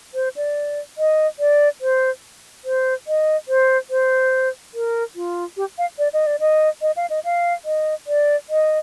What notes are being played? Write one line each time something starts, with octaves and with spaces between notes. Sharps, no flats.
C5
D5
D#5
D5
C5
C5
D#5
C5
C5
A#4
F4
G4
F5
D5
D#5
D5
D#5
D#5
F5
D#5
F5
D#5
D5
D#5